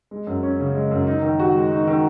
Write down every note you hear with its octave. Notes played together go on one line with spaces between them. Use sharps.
G#3
F#2
C#4
C#3
G#3
F#2
D#4
D#3
F#4
G#3
D#4
D#3